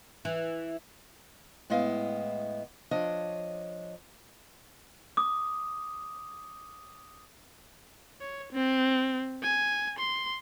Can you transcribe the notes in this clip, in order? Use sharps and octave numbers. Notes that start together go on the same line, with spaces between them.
E3
A2 G#3 B3 E4 D#5 F5
F3 D4 C#5 D#5
D6 D#6
C#5
C4
G#5
C6